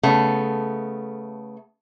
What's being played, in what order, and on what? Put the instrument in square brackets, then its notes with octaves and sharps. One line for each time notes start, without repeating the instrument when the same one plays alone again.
[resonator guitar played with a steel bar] C#3 A3 B3